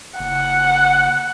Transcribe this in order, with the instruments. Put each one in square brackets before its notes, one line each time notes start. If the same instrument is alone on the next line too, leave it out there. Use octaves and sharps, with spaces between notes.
[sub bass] F#1 [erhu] F#5